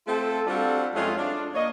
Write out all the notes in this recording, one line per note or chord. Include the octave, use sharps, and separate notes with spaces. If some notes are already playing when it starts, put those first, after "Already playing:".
A3 C4 F4 A4
G3 C4 D4 F4 F#4 A4
F2 G#3 A3 C#4 F4
D4
A#3 C#5 D#5